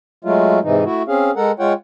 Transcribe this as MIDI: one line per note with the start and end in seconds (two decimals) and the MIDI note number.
0.25 0.59 54
0.25 0.59 56
0.25 0.59 57
0.25 0.59 65
0.63 0.84 44
0.63 0.84 48
0.63 0.84 52
0.63 0.84 63
0.85 1.02 57
0.85 1.02 64
0.85 1.02 66
1.08 1.31 60
1.08 1.31 61
1.08 1.31 68
1.08 1.31 77
1.36 1.51 56
1.36 1.51 69
1.36 1.51 70
1.36 1.51 78
1.59 1.73 56
1.59 1.73 65
1.59 1.73 73
1.59 1.73 78
1.59 1.73 79